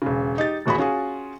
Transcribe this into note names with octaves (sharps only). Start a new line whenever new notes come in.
E1 C#3
D#4 G4 A6
D#1 A1 F#4 G#4 B5
C#4 F4 F#4 G#4